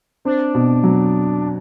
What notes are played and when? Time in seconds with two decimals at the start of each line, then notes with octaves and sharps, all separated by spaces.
0.25 C4 D4
0.55 B2
0.84 F#3